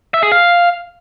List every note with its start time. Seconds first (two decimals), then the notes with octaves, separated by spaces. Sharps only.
0.14 E5
0.23 G#4
0.32 F5